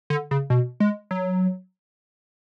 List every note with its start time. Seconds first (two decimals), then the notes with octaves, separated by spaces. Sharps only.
0.10 D3
0.31 C#3
0.50 B2
0.80 G#3
1.11 F#3